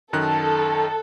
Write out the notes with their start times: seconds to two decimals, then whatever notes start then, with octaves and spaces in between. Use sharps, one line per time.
0.13 F#2 D#3 A4 F#6